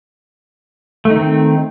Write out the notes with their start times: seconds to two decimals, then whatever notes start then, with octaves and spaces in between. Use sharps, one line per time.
1.05 A3
1.10 D#4
1.15 D#3
1.19 C4